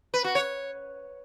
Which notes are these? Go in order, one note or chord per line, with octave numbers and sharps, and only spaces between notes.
B4
F#4
C#5